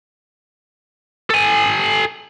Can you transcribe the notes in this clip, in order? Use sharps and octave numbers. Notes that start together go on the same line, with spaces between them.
A4 G#5